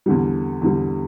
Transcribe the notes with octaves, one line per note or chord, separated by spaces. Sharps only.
E2 D3 G3
E2 D3 G3